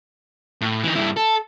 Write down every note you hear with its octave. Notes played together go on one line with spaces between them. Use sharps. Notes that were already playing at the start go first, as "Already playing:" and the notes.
A2
E3 D#4
G2 E4
A4